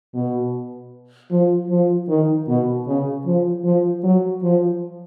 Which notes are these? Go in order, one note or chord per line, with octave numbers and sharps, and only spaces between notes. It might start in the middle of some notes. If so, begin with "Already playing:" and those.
B2
F3
F3
D#3
B2
C#3
F3
F3
F#3
F3